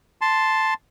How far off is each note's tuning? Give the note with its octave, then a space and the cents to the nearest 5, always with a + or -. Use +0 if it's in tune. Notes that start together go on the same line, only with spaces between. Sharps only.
A5 +0 C6 +0